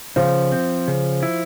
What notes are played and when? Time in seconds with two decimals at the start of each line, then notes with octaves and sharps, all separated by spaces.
0.16 C#3 F3
0.52 C4
0.88 C#3
1.23 E4